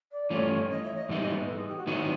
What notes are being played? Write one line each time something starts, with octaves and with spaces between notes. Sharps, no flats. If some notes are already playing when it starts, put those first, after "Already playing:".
D5
G2 E3 A3 C#4 F4 C#5
D#5
E5
D#5
G#2 E3 G3 B3 D#4 E5
D#5
B4
A4
G#4
G4
F#4
G#2 D#3 F#3 B3 D#4 E4